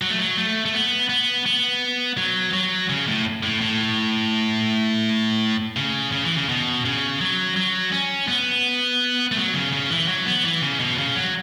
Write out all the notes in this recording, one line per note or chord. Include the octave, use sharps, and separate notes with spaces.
F#3
A3
F#3
A3
A3
B3
B3
B3
F#3
F#3
C#3
A2
A2
A2
C#3
C#3
E3
C#3
B2
C#3
F#3
F#3
C#4
B3
A3
F#3
C#3
C#3
E3
F#3
B3
E3
C#3
B2
C#3
F#3